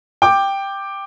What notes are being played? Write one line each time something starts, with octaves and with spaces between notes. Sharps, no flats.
G5 D6